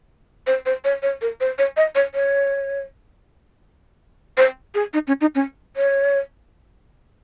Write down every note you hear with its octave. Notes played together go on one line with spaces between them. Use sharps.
C5
C5
C#5
C#5
A#4
C5
C#5
D#5
C#5
C#5
C5
G#4
D#4
C#4
D#4
C#4
C#5